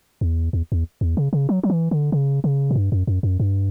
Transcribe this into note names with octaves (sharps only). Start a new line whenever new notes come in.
E2
E2
E2
E2
C#3
C#3
F#3
F#3
E3
D3
C#3
C#3
A#2
G2
F#2
F#2
F#2
G2